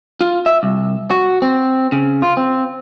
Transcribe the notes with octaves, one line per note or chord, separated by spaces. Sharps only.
F4
E5
C2
F#4
C4
C#3
F4
C4